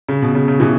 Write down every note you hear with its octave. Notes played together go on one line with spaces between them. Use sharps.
C#3
B2
C#3
C#3
B2 E3